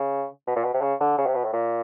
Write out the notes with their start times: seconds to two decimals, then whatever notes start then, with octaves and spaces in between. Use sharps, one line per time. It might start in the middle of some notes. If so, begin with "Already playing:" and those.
Already playing: C#3
0.47 B2
0.56 A#2
0.64 B2
0.74 C3
0.82 C#3
1.01 D3
1.18 C#3
1.27 C3
1.35 B2
1.45 A2
1.53 A#2